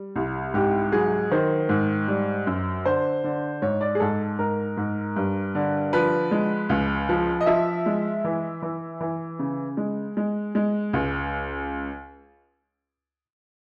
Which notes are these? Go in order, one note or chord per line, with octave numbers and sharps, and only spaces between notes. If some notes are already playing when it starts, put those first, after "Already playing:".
Already playing: G3
C2
G#2 G4
F#3 G#4
D#3 C5
G#2
G3
F#2
D3 C5
D3
G#2 C#5
D5
G#4
G#2 A4
G#2 A#4
G#2
G2
D3
F3 B4
G#3
C#2
F3
D#5
F3 E5
G#3
E3
E3
E3
C#3
G#3
G#3
G#3
C#2